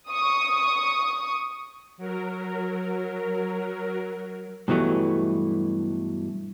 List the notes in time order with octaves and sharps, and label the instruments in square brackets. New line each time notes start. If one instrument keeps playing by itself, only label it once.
[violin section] C#6 D#6
[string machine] F#3 A#4
[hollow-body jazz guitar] G2 B2 E3 F#3 A3